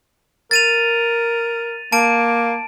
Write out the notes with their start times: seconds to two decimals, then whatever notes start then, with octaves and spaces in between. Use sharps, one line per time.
0.51 A#4 A6 D#7 F7
1.92 A#3 A5 D7